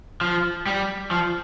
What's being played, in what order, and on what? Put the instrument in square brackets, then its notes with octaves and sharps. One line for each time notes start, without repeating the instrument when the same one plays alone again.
[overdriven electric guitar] F3
G3
F3